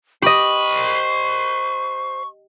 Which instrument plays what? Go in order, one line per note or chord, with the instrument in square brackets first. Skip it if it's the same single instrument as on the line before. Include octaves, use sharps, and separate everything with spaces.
[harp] G4 D#5 [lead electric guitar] C5 B5 [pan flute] C#6